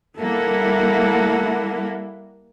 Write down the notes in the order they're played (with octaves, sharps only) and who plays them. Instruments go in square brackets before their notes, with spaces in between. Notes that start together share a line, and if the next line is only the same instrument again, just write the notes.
[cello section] G3 A#3 E4 [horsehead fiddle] A4 F#5